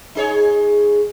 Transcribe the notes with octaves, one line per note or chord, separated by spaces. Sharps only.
D#4 G#4 C#5